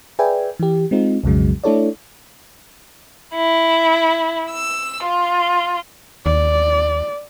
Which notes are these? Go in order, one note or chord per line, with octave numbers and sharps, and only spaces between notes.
G#4 B4 D5 E5 G5 G#5
E3 G4
G#3 C4 D#4 F4
B1 F2 C#3 F#3 G#3
A3 D4 E4 A4 C#5 D5
E4
E6
F4
D#2 D5